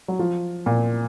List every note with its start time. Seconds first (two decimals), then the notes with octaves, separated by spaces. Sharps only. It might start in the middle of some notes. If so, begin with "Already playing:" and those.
0.08 F#3
0.19 F3
0.66 A#2